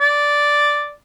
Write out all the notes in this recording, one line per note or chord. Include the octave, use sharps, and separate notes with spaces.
D5